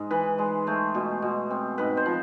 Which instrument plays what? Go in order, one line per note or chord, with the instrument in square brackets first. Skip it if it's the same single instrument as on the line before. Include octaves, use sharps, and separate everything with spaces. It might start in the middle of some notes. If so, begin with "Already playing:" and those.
Already playing: [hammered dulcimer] G#2 G#3
E3 B4
G#3
A3 C5
B2
B2
C4
G#2 B4
C5
F3